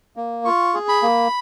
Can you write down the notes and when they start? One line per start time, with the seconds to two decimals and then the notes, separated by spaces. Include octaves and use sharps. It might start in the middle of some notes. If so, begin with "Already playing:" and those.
0.17 A#3
0.45 F4 C#6
0.74 G#4
0.88 B5
1.02 A#3